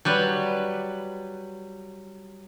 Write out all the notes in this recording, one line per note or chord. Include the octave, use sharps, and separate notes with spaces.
F#3 G3 B4